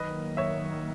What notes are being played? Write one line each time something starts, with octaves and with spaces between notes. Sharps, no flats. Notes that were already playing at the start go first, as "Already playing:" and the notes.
Already playing: D#3 F#3 A#3 B4 D#5
C#5 E5